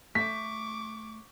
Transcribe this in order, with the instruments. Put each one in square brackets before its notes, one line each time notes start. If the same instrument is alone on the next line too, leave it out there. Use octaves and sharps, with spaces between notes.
[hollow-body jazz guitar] A3 E5 [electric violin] C#6 D6 [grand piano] B6